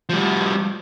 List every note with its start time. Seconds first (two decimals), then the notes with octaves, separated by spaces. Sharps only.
0.09 F3 G3